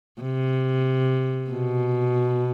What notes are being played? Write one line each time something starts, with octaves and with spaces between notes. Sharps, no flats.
C3
B2